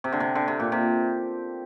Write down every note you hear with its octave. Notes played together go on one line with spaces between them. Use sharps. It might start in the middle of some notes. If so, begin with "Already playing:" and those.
C3
D3
C3
D3
C3
A#2
C3